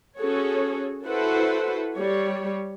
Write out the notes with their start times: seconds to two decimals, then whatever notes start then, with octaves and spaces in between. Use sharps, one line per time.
0.18 C#4 F#4 G#4 A4 C#5
1.05 E4 F#4 A4 B4 C5 F#5
1.94 G3 C#5